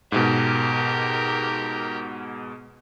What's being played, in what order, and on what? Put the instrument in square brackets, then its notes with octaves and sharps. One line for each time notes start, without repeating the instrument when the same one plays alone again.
[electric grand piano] G#2 B2 [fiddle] G4 A#4